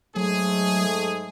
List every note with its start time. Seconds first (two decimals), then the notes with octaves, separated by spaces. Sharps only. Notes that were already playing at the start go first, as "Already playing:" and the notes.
0.16 G#2 F#3 G#3 A3 G#4